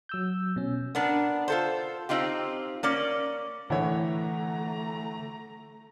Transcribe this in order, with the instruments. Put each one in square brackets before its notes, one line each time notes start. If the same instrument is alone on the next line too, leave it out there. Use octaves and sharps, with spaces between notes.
[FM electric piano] F#3 E6 G6
B2 C#4
[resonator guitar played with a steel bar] B3 D4 A#4
F4 A4 C5
C4 D#4 F4 G4
A#3 C#4 D5
[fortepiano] A2 C#5 [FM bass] D3 [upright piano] E3 F#5 [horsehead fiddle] A3 A#5